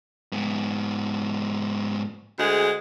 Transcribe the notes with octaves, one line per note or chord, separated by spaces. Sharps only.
G#2 B3
D2 G#3 G#4